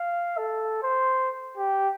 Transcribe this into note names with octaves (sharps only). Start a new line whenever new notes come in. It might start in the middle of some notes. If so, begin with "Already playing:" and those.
Already playing: F5
A4
C5
G4